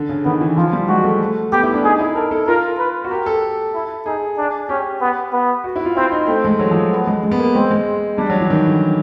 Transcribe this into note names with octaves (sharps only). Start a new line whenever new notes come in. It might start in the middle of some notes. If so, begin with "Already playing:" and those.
Already playing: D3
C#3
D#3 B3
E3
F3 F4
G3
G#3 F#4
A3
B3 G4
E4
D4
D#4 G#4
E4
A4 A#4
A4
F4 A#4
B4
F#4
G4 A#4
A4
E4
D#4 G#4
D4
C#4 G4
B3
B3
F#4
E4
F4
C4 E4
D#4
A3 C4
G#3
F#3
F3
B3
G#3
G#3
B3
A#3
G#3 C4
G#3
G3 D4
F#3
E3
D#3
D3